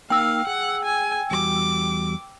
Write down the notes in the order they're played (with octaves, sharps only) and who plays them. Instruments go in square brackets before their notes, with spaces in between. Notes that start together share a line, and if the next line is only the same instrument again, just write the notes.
[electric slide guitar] A#3 D#4 A#4 [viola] F5 [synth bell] G5 E6
[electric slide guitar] G#4 [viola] F#5
[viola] G#5
[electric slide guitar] E2 G3 F#4 [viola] D6